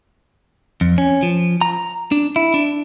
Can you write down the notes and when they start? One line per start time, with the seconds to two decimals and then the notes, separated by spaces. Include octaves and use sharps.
0.81 F2
0.98 C#4
1.23 F3
1.61 A#5
2.12 D4
2.36 E4
2.54 D4